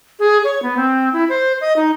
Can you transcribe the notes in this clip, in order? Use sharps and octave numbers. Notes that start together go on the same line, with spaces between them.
G#4
C#5
B3
C4
E4
C5
D#5
D#4